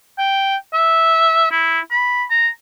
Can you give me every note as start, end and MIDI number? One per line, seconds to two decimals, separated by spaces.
0.19 0.55 79
0.74 1.50 76
1.51 1.80 64
1.91 2.24 83
2.30 2.48 82